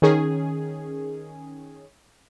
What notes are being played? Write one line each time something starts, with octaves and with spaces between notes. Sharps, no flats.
D#3 C#4 G#4